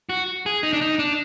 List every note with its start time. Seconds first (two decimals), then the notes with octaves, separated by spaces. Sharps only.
0.09 F#4
0.46 G#4
0.63 D#4
0.73 D4
0.81 D#4
0.99 D4